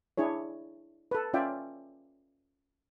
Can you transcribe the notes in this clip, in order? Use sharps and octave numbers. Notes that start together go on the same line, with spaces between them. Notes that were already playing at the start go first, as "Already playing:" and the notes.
D4 E4 G#4 C#5
A4 B4
C#4 F4 D5 E5 G5